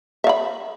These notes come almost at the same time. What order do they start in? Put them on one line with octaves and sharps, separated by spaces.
E5 F5 B5